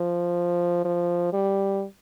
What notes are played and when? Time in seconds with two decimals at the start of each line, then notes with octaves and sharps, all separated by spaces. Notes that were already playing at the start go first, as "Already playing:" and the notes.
Already playing: F3
0.85 F3
1.33 G3